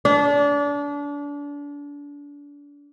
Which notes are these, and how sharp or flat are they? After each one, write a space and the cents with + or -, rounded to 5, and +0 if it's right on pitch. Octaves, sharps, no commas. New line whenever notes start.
D4 -30